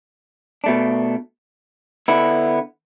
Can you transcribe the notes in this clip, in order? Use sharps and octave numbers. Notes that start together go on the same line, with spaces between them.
B2 A3 D4
D3 B3 E4